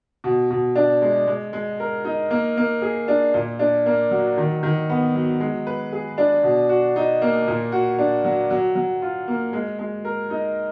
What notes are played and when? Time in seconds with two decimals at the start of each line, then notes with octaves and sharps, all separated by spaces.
0.24 B2
0.50 B2
0.76 D4
1.02 G#3
1.27 G#3
1.53 G#3
1.80 A#4
2.05 D#4
2.31 A#3
2.57 A#3
2.82 G#4
3.08 D4
3.34 A#2
3.59 D4
3.86 A#3
4.11 F#3
4.37 D#3
4.63 D#3
4.90 B3
5.15 F#3
5.40 G#3
5.67 B4
5.92 G#4
6.18 D4
6.43 B2
6.69 F#4
6.96 D#4
7.22 A#3
7.48 A#2
7.72 F#4
7.99 D4
8.24 F#3
8.50 F#3
8.75 F#3
9.02 F4
9.28 A#3
9.53 G#3
9.79 G#3
10.05 A#4
10.30 D#4